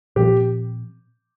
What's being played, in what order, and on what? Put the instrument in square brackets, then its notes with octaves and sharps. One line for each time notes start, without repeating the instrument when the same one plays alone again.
[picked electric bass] A#2 F3 C4 [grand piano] G4